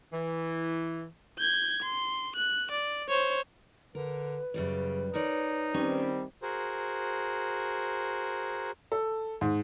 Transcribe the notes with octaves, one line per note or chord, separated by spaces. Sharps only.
E3
G6 G#6
C6
F#6
D5
C5 C#5
D3 A#4 B4
F#2 C#3 G3 D5
D#4 A#4 C#5 D5
D#3 G3 C4 C#4
F#4 G#4 A#4 C5
A4
G#2